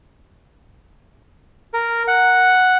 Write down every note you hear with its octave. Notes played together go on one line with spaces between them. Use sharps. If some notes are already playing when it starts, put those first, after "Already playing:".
A#4
F#5